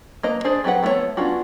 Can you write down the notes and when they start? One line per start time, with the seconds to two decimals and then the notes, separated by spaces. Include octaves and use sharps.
0.23 A#3 B4 D#5 A#5
0.44 D4 G#4 C5 D5
0.64 F#3 C4 G4 B4 F#5
0.83 F3 A3 B3 F#4 C#5
1.17 B3 C#4 D4 F4 F#4